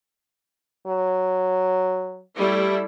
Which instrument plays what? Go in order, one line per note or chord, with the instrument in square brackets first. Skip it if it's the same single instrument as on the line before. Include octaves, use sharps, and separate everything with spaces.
[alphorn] F#3
[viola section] G3 A3 E4